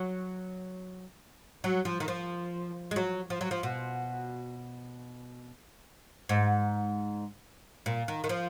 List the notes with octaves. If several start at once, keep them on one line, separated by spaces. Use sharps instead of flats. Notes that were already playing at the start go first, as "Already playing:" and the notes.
Already playing: F#3
F#3
F3
D#3
F3
G#3
F#3
F3
F#3
F3
B2
G#2
A#2
D#3
D#3
F3